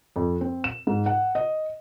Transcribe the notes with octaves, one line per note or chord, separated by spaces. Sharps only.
F2
C4
E7
G#2
F#5
D#5